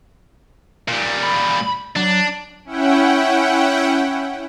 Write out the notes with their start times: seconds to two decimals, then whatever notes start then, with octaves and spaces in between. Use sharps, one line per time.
0.88 A#2 G3
1.23 B5
1.96 F#3 D4
2.65 C#4 E4 F#5 G5